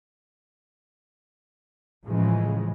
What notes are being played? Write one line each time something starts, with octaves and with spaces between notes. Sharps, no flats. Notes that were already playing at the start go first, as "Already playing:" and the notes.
A2 C#3 E3 F3 G#3